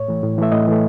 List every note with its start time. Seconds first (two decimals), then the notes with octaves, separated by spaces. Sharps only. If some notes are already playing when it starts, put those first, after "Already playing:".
Already playing: A2 C#5
0.08 E3 A3
0.23 A2
0.38 E3 A3 E5
0.52 A2 D#5
0.67 E3 A3